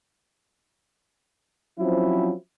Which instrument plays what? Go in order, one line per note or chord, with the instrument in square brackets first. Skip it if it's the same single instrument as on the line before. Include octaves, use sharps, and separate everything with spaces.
[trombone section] F3 F#3 C4 C#4 E4